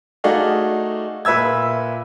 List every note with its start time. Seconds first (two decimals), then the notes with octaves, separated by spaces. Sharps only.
0.24 A3 D#4 F#4 G#4 D5 F5
1.25 A#2 B4 E5 E6 G#6